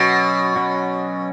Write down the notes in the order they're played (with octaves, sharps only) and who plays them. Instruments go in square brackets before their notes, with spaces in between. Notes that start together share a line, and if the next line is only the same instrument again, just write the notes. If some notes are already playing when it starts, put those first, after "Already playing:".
Already playing: [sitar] B2 [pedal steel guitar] F#3 C#4 F#4
[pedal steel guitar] F#3 C#4 F#4